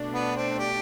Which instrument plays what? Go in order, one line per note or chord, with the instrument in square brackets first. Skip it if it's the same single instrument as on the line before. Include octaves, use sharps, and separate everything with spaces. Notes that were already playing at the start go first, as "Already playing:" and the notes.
Already playing: [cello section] B2 A3 D4
[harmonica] B3
C4
G4